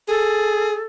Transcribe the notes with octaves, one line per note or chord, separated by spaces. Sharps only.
G#4 A4